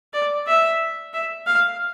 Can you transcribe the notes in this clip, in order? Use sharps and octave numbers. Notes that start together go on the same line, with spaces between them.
D5
E5
E5
F5